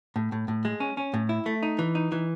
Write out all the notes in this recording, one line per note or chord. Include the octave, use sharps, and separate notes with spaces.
A2
A2
A2
G#3
C#4
C#4
A2
E4
A3
D#4
E3
D#4
E3